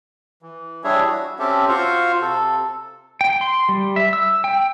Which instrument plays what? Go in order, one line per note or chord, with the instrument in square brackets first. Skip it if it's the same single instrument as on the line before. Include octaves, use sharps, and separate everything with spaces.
[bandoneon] E3
G3 D4 E4 G#4 C#5 E5
F#4
C4 C#4 G4 A4 E5
F4 F#4 C5 F5 C#6
C3 A4
[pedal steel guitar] G5
C6
G3
E5
E6
G5